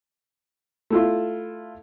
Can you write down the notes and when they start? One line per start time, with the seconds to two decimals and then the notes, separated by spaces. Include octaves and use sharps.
0.90 A3 E4 F4